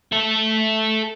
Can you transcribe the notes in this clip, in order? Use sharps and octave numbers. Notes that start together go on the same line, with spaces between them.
A4 E5